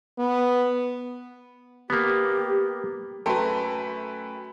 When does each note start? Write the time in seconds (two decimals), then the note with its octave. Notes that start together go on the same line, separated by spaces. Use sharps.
0.19 B3
1.90 A#3 B3 G4
3.26 F#2 A3 B4 G5 A5 A#5 C6